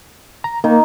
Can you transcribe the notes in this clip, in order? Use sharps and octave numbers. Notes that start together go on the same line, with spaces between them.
A#5
D#3 A#3